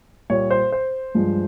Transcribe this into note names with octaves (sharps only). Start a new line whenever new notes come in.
A#2 G3 C#5
C5
C5
G2 F3 G#3